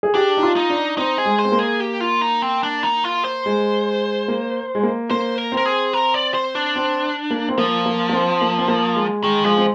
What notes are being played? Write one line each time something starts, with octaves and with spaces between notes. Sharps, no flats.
G#4
D4 G4
D#4
F4
D#4
D4
C4 D#4
G#4
G#3
C5
C4
A#3
G#4
G4
F4
D#4
C4
D4
D#4
F4
C5
G#3
A#3
G#3
A#3
A#3 C5
A#4
C4
A#4
G#4
A#4
D5
C5
D4
C4
A#3
C4
F3 A#3
A#3
A#3
C4
A#3
C4
A#3
G#3
D#3 G#3
F3 G#3
C4